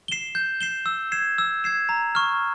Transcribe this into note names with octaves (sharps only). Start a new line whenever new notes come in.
C7 E7 G7
G6
C7 E7 G7
E6
G#6 C7 E7
E6
G#6 C7 E7
A#5
C#6 F6